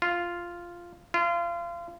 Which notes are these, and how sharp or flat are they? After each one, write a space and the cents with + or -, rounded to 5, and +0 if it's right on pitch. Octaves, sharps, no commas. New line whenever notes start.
F4 -5
F4 -30